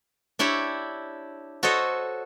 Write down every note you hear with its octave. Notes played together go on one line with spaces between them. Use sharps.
D4 E4 G4 C#5
F#4 A4 C5 C#5 D#5